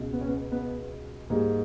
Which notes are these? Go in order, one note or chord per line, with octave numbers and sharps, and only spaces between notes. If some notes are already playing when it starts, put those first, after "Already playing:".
Already playing: C#2 B2 G#3
B3
C#4
B3
B3
G#2 G3 A#3